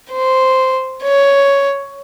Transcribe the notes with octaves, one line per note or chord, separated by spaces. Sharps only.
C5
C#5